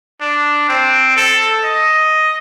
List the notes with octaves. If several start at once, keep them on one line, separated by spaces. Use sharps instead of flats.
D4
C4
A4
D#5